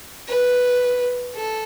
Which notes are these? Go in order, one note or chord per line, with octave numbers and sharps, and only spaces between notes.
B4
A4